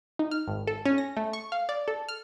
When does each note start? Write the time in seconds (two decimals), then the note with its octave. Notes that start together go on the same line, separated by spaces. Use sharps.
0.19 D#4
0.31 F6
0.48 G#1
0.67 A4
0.86 C#4
0.98 A#6
1.17 A3
1.33 C#6
1.52 F5
1.69 D5
1.88 A4
2.09 F6